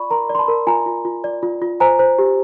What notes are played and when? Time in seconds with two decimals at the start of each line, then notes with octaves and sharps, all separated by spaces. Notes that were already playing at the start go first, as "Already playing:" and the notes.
Already playing: F4 D5 B5 C#6
0.10 A#4 A#5 C6
0.30 D5
0.35 C6
0.38 A5 B5
0.48 A#4
0.67 F4 G#5 A#5
0.86 F4
1.05 F4
1.24 D5
1.43 F4
1.62 F4
1.80 C5 G#5 A#5
1.99 C5
2.18 G4